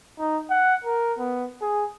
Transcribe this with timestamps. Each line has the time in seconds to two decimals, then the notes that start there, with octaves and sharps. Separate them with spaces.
0.19 D#4
0.50 F#5
0.84 A#4
1.19 B3
1.62 G#4